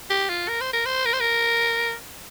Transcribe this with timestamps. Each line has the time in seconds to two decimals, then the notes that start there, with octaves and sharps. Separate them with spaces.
0.10 G4
0.30 F4
0.48 A#4
0.61 C5
0.73 A#4
0.86 C5
1.05 A#4
1.13 C5
1.20 A#4